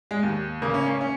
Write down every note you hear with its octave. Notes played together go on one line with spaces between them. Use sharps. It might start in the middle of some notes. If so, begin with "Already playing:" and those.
G#3
D#2
C#3 A#3
C#4
A#3
C#4